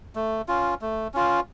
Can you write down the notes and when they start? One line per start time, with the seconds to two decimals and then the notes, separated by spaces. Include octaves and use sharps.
0.15 A3
0.48 C#4 F4
0.81 A3
1.14 C#4 F4